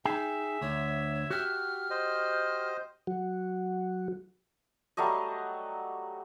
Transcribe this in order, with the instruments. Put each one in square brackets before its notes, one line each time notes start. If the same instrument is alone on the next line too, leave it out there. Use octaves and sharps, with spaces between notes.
[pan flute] D#4 [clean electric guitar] G#4 G5 [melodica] E5
[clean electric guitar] D2 [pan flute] C#5
[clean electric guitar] F#4 G4 [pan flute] F6
[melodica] C5 D#5
[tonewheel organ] F#3 F#4
[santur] F#3 G3 A3 D#5